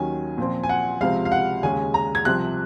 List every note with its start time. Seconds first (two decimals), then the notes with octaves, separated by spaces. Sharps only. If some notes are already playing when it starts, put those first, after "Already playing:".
Already playing: D#2 D#3 F#3 C#4 G#5
0.38 A#2 F3 C4
0.63 G#5
0.69 F#5
1.01 C#2 C3 F3 C4 F5
1.25 F5
1.32 F#5
1.63 D#2 C#3 G#3 C#4 G#5
1.94 A#5
2.15 G#6
2.25 C2 C3 F3 C4 F#6